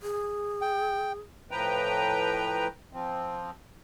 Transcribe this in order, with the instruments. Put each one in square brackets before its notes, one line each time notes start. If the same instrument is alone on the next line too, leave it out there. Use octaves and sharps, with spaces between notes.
[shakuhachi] G#4
[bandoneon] G5
[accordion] A2 F3 B4 G5 A#5
F3 C4